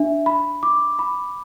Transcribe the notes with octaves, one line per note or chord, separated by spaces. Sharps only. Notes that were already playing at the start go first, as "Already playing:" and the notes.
Already playing: D4 E5
B5
D6
B5